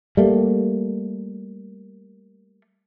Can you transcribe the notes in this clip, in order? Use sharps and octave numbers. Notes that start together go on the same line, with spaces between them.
G3 A3 A#3